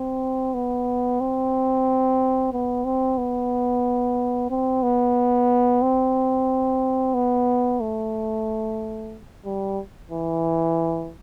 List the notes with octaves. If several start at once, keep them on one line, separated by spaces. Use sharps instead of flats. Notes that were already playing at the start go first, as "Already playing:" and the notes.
Already playing: C4
B3
C4
B3
C4
B3
C4
B3
C4
B3
A3
G3
E3